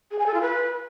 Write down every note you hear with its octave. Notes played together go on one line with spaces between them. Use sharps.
G#4
G#5
A4
F4
B4